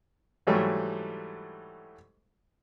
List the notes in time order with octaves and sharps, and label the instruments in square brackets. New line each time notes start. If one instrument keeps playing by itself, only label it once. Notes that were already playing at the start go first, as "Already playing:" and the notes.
[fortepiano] G#2 E3 F#3 G3 A3